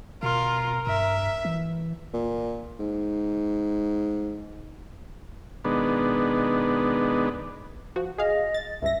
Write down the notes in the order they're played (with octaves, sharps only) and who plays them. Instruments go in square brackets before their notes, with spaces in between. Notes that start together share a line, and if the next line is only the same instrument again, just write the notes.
[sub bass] B2 [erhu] F4 [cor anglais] A#4
[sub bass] G2 [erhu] E5
[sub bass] E3
[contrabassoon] A#2
G#2
[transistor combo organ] B2 D#3 G#3 B3 D4
[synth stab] F3 F#4
[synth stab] G#4 F5 [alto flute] D#5
[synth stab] A6
[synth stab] C#2 G2 A#6 [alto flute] E5